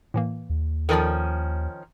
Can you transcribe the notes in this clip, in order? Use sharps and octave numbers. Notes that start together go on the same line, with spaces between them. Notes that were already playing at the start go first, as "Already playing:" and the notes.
A2 E3 A#3
D#2
D#3 F3 C#4 A4 A#4 D5